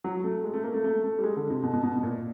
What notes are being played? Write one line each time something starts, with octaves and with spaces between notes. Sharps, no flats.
F#3
A3
G#3
A3
A#3
A3
A3
A3
G3
G#3
D3
C3
B2
B2
B2
B2
A#2